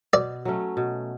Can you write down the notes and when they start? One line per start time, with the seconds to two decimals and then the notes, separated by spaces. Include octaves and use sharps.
0.13 B2 D5
0.45 F#3 A3 C#4
0.77 B2